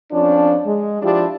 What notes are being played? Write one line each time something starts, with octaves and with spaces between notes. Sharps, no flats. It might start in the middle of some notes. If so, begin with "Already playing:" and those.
F2 F3 C#4 D4
G#3
F3 D4 E4 G4